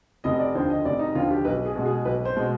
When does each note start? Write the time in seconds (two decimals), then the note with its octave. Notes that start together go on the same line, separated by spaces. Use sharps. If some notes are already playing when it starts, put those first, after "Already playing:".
0.24 F1 D#5
0.39 D5
0.55 D#2 D3 F3 C5
0.70 D#5
0.85 F1 D5
0.99 D#4
1.15 D#2 D3 F3 F4
1.31 G4
1.45 B1 B4
1.66 G#4
1.76 B2 G#3
1.86 G#4
2.05 B1 B4
2.25 C5
2.36 B2 G#3